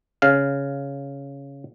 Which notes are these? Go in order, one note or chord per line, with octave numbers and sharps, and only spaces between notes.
C#3 F5